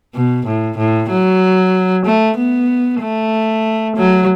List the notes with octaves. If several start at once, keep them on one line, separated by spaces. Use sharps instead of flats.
B2
A2
A2
F#3
A3
B3
A3
F#3